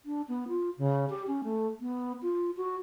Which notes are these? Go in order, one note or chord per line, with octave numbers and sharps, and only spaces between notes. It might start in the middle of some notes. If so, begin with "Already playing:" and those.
D4
B3
F4
C#3
G4
C#4
A3
B3
F4
F#4